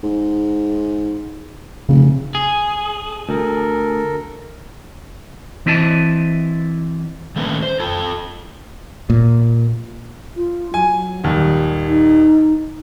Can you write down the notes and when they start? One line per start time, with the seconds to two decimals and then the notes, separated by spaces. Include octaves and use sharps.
0.03 G#2
1.89 F1 C#3
2.35 G#4 D#6
3.29 D2 A4 A#4
5.66 E3 C4 E4 D#5 A5
7.36 D#3 A3 A#3 C#4 D4 B4
7.62 C5
7.80 F4 A4 A5
9.10 A#2
10.36 F4
10.74 F#3 G#5
11.24 D#1 D#2 G3
11.88 D#4